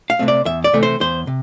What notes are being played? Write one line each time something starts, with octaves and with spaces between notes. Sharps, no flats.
F5
C3 E3 A3 C4
D5
E2 E5
D5
C3 E3 A3 C4
C5
E2 C5
C3